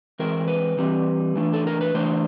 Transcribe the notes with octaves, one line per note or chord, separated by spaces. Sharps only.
E3 G#3 C4 A#4
B4
E3 G3 C4
E3 A3 D4
A4
A#4
B4
E3 A3 D4 C5